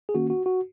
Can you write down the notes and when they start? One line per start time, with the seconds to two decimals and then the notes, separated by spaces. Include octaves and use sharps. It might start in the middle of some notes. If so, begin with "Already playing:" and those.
0.09 G#4
0.15 D#3 A#3 C#4 F#4
0.30 F#4
0.46 F#4